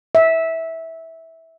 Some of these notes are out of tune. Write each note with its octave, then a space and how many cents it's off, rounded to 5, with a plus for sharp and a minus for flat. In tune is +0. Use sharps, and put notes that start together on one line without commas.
E5 -15